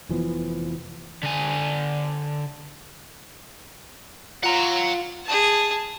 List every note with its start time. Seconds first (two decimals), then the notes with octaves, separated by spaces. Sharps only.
0.09 F1 E3 F3 B3
1.23 D3 G#5
4.43 F4 F#5 A#5
5.25 G#4 A5